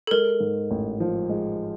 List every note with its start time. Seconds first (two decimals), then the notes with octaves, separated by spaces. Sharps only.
0.07 A4
0.11 G#3 A#4
0.40 G#2
0.71 A1
1.00 F3
1.29 G#3